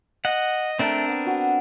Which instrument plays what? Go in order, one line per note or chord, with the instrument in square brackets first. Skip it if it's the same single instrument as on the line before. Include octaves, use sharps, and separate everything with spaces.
[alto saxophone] D#5 [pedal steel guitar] F#5
[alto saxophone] A3 [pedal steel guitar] C4 D4 A#4
[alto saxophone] B3
[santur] F#4